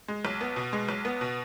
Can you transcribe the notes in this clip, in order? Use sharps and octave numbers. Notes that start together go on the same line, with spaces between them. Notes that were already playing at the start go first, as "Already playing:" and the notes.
G#3
B1
B3
B2
G#3
B1
B3
B2